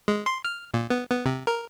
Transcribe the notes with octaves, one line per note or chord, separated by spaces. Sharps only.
G#3
C6
F6
A#2
B3
B3
C3
A#4